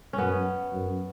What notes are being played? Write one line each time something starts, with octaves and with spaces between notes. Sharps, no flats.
C#4
F#2 B3
F#2